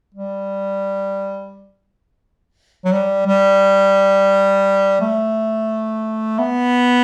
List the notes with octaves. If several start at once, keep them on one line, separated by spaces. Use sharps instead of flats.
G3
F#3
G3
G3
A3
B3